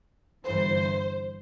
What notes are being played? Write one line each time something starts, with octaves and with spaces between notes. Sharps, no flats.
G1 G2 E3 C5